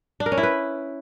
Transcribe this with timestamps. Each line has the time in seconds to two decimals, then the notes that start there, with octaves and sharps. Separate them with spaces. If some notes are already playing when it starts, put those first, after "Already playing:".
0.20 D4
0.26 A#4
0.32 C#4
0.38 E4
0.43 B4